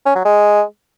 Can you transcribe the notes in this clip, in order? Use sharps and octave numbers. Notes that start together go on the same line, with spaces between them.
C#4
F#3
G#3